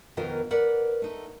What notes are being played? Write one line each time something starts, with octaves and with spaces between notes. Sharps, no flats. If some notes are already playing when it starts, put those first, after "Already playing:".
F2 B2 D#3 D#4 F4 A#4
A#4 B4 D5 F#5
A3 D#4